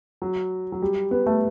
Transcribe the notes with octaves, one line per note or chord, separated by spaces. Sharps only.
F#3
F#3
G3
B3
A3